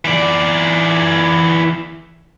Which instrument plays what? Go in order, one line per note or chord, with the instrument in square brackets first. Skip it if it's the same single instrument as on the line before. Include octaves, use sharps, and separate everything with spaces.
[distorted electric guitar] E3 D5